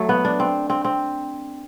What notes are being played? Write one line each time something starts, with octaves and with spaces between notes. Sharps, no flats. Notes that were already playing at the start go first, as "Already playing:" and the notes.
Already playing: F#3 A3
B3
D4
C4
C4
C4